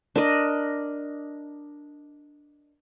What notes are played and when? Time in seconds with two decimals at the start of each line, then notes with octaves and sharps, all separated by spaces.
0.16 D4 A#4 D#5